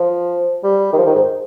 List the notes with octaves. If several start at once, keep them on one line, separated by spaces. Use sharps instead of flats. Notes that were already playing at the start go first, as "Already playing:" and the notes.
Already playing: F3
G3
D#3
F3
D#3
G#2